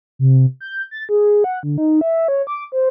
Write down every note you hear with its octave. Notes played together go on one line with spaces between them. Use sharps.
C3
G6
A6
G#4
F#5
D3
D#4
E5
C#5
D6
C5